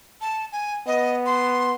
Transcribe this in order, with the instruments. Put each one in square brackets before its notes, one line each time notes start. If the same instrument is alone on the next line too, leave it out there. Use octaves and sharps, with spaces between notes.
[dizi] A5
G#5
[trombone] B3 [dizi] D#5
[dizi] C6